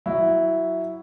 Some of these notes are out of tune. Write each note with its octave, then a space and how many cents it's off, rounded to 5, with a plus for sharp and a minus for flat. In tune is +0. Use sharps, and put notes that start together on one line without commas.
F#3 +5 E4 +0